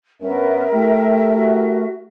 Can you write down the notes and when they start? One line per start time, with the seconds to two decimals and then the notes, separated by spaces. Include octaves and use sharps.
0.21 G2 B3 C#4 A#4 E5
0.72 A3 E4 G4 G5
1.35 F#4